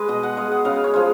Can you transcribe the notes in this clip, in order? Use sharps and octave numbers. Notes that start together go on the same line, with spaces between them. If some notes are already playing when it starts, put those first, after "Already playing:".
Already playing: G#3 B4
B2 D#5
F#5
G#3 F5
F#5
C#3 F5
C#5
F3 G#3